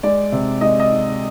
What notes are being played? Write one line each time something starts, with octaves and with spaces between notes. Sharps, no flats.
G#3 D5
C3
G#3 D#5
D#5